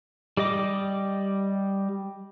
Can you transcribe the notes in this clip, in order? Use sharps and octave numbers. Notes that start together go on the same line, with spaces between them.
G3 G4 D#5 D6